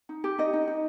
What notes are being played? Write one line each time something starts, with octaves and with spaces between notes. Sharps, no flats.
D#4
G4
D#4 D#5
D#4
D#4